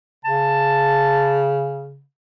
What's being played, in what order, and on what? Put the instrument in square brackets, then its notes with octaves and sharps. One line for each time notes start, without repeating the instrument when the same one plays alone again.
[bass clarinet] C#3 [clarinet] A5